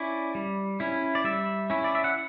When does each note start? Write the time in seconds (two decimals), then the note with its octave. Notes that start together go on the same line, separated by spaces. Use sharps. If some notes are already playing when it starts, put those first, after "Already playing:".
Already playing: C#4 E4 D5
0.35 G3
0.80 C#4 E4
1.15 D5
1.24 G3 E5
1.70 C#4 E4
1.84 D5
1.95 E5
2.04 F#5